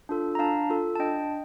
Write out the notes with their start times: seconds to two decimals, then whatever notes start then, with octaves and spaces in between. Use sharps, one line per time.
0.09 D4 F4 A4
0.35 A#5
0.39 D4 F5 A5
0.70 F4 A4
0.95 A5
0.99 D4 D#5 G5